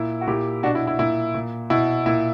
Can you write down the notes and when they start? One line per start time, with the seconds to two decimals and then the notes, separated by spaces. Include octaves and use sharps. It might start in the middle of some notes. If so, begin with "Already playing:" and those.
Already playing: A#2 E4
0.21 F#4
0.27 A#2 E4 G4
0.63 B2 D4 F#4
0.75 E4
0.87 E4
0.99 A#2 E4
1.35 A#2
1.70 B2 E4
2.06 A#2 E4